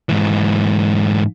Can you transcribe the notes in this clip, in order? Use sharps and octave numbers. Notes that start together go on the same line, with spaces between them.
G#2 E3